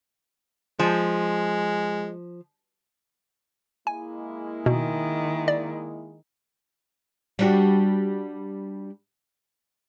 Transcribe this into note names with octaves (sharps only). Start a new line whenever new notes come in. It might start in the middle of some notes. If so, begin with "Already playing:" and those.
F3 G#3
G#3 A#3 E4 G#5
B2 D#3
D5
G3 D4 F#4